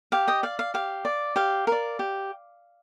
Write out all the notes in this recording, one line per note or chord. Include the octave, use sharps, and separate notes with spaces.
G4 F5
D#5 G5
D5 F5
F5
G4 F5
D5
G4 F5
A#4 D5
G4